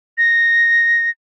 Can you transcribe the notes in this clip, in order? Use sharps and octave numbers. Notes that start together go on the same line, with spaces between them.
A#6